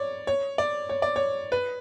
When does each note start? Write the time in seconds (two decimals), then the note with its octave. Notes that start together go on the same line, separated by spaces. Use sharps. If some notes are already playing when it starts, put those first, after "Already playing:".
Already playing: C#5 D5
0.27 C#5
0.58 D5
0.89 C#5
1.02 D5
1.16 C#5
1.52 B4